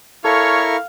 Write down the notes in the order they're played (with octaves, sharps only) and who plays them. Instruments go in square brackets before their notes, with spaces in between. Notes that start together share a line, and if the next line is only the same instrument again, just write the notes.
[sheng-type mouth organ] E4 A#4 C#6 [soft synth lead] A4 [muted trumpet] C#5 [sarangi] F5